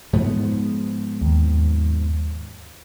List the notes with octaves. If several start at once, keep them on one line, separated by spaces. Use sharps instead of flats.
G#2 F3 B3
D#2